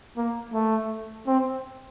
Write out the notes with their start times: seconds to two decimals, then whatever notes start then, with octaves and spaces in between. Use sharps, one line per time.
0.17 A#3
0.53 A3
1.27 C4